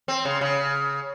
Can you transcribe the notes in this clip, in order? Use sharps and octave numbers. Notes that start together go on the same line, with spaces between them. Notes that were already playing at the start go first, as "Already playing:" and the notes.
C4
C#3
C#3